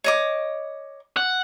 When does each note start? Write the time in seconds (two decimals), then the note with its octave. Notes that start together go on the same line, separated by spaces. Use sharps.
0.04 C#5 D#5 D6
1.17 F#5